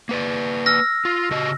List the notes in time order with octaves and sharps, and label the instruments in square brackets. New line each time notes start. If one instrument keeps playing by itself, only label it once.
[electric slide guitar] A#3 B4 D5
[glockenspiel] E6 F6 A#6
[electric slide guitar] F4
C#3 F#4 D#5